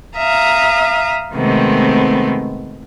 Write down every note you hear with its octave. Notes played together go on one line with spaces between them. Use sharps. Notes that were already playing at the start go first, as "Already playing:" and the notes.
E5 F5 A#5 D#6
C3 D#3 G#3 A3 B3 C4